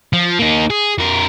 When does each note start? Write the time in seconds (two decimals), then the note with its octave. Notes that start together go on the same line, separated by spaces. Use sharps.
0.13 F3
0.39 A#3 D#4
0.70 G#4
0.98 F2 A#4